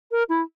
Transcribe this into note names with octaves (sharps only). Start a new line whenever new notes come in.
A#4
E4